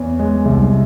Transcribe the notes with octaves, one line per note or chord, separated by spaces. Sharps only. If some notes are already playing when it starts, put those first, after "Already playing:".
Already playing: E2 C#5
G#3
C2